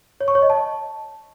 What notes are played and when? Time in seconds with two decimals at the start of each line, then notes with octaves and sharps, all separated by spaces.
0.21 C#5
0.28 C#6
0.35 C#5
0.42 D#5
0.50 A5